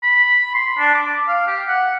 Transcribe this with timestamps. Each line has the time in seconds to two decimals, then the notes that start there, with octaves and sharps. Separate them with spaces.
0.03 B5
0.54 C6
0.78 D4
0.95 D6
1.28 F5
1.47 G4
1.68 F#5